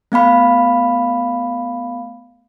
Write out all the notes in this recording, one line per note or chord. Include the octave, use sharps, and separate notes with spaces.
A3 B3 F5 B5